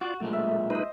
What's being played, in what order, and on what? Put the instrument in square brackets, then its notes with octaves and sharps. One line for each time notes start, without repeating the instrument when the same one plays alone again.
[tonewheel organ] F4 D5 [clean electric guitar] F#4
[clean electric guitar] B1 A#2 G#3 [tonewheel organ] A3
[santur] E5
[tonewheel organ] D#4 B4 [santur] C5 D#5